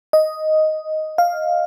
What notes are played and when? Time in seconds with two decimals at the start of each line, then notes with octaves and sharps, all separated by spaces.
0.13 D#5
1.18 F5